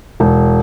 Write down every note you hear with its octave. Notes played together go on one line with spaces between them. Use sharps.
E1